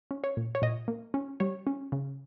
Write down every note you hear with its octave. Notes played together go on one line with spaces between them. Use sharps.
C#4
C#5
A#2
C#5
A#2 D#5
A#3
C#4
G3 C#5
C#4
C#3